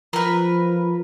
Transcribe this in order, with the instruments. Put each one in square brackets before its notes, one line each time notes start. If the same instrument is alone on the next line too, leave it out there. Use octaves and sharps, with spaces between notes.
[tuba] F3 [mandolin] A#4 B4